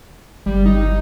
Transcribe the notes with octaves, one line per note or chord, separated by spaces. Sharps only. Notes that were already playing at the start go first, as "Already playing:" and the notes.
G1 G3
D#4